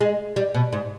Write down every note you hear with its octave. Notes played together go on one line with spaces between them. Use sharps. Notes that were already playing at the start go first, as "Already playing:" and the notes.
G#3
G3
B2
G#2